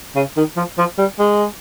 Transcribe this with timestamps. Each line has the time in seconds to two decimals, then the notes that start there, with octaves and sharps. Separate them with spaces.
0.16 C#3
0.37 D#3
0.57 F3
0.78 F3
0.99 G3
1.19 G#3